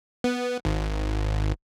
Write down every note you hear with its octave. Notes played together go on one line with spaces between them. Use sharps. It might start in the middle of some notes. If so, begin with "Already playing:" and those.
B3
G#1